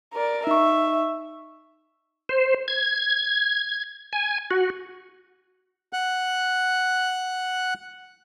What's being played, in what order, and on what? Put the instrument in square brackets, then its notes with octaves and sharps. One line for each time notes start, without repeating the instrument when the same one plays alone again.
[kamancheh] A#4 D5
[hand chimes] D#4 C#6 [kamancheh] E5
[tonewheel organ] C5
G#6
G#5
F#4
[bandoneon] F#5 F#6